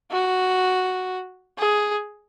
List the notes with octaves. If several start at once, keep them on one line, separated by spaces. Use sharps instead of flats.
F#4
G#4